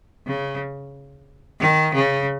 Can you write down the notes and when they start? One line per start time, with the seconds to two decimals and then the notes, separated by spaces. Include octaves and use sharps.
0.27 C#3
1.60 D#3
1.94 C#3